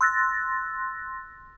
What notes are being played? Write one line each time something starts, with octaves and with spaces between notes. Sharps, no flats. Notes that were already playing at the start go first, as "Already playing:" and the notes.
C6 E6 F#6 A6 A#6